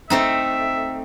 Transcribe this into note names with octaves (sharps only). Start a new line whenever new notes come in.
A3 C4 D#4 E5